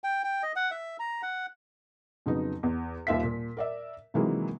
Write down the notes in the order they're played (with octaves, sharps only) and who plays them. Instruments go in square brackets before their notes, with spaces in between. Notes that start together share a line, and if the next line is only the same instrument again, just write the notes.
[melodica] G5
G5
D#5
F#5
E5
A#5
F#5
[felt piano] F2 C#3 F#3 B3 D#4
E2
D#1 D#2 F4 E5 F5 B6
A#2
A#4 D5 E5
C3 D#3 E3 F#3 G#3 A#3